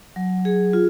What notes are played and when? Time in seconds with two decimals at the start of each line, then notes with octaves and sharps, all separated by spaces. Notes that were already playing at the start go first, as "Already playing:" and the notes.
0.16 F#3
0.45 G#4
0.73 F4